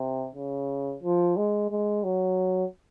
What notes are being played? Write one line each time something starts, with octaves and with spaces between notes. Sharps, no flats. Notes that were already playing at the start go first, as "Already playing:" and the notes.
Already playing: C3
C#3
F3
G#3
G#3
F#3